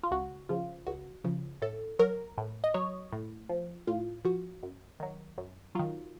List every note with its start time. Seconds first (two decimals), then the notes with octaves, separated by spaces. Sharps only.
0.03 F4
0.11 C#2 F#4
0.49 C#3 F3 F4
0.87 C#2 F#4
1.24 C#3 F3
1.62 A2 A4
1.99 F#3 A#4
2.38 A2
2.64 D#5
2.74 F#3 C#5
3.12 A2
3.49 F3
3.87 A2 F4
4.25 F3 F#4
4.63 F#2
5.00 D#3 F#3
5.38 F#2
5.75 D#3 F#3 F4